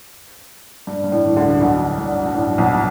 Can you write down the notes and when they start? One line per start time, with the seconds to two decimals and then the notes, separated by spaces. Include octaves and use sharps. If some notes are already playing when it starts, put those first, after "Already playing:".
0.87 G2
1.04 G2
1.12 A2
1.25 E3
1.36 D2 D3
1.61 B1 B2
1.98 G2
2.26 G2
2.34 A2
2.58 B1 B2